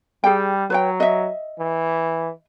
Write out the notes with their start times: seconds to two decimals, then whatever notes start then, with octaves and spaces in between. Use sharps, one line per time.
0.24 G3 G#4 G5
0.70 F#3 B4 C#5 G5
1.00 D#5 E5
1.59 E3